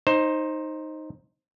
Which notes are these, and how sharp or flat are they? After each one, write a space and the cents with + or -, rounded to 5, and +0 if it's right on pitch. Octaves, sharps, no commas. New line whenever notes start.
D#4 +0 C5 +15